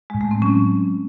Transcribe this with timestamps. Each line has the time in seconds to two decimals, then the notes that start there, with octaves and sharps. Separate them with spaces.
0.10 A2 G#3
0.21 A3
0.31 C4
0.42 F#3 C#4